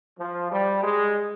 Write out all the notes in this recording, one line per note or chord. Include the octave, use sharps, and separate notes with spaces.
F3
G3
G#3